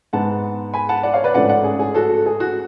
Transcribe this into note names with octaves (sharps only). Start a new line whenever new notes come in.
G#2 G#3 B3 F#5 A5
G#5 B5
F#5 A5
D5 F#5
C#5 F5
B4 D5
A1 G#2 F3 A3 C#4 D5 F#5
D5 F#5
G#4
G#4
F#4 A4
G#4
F#4